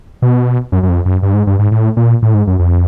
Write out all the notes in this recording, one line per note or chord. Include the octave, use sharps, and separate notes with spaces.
B2
F#2
F#2
F2
F#2
G2
G#2
G2
G#2
A2
A#2
A2
G#2
F#2
F2